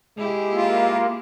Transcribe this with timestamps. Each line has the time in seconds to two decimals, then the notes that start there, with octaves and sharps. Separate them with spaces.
0.17 G#3 E4 G4 G#4
0.51 A#3 F4